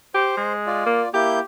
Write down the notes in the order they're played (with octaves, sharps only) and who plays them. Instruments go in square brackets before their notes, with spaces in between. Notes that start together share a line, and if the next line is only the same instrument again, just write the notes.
[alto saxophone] G4 [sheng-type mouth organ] C5
[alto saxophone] G#3
[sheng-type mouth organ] F4 D5
[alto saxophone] A#3
[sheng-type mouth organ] A#3 E4 G6 [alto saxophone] G4